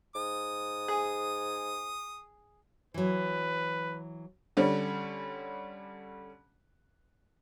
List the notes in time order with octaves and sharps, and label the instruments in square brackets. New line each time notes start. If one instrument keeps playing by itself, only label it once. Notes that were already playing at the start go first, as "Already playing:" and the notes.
[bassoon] G#2 [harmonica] D#6
[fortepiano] G#4
[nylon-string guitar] E3 F#3 [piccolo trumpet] B4
[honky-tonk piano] D3 G3 C#4